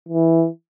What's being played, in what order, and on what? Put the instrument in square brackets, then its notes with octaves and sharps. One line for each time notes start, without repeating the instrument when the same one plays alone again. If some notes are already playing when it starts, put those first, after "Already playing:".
[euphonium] E3